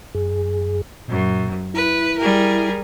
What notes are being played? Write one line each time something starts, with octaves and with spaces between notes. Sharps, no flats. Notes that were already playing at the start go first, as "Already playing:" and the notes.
F#2 G#4
F#2 A#2
E4 B4
G3 G#4 A#4